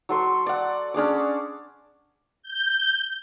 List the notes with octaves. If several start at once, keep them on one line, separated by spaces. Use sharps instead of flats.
F#3 A4 C6 C#6
D5 F#5
C#4 D4 G#4 D5
G6